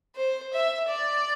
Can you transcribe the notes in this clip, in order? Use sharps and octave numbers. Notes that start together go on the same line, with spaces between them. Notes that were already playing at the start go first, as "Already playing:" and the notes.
C5
E5
D5